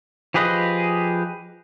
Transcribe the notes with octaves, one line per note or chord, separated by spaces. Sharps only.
F3 G4 G#4 B4 D#5